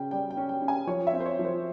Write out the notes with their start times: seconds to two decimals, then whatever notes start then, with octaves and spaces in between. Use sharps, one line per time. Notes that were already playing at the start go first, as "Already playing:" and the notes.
Already playing: C#3 C#4 G5
0.11 G3 G5
0.31 G5
0.37 C#4
0.49 G5
0.62 C#4
0.68 G#5
0.87 F3 C#5
1.07 E5
1.13 C4
1.20 C5
1.26 C#5
1.39 F3
1.45 C5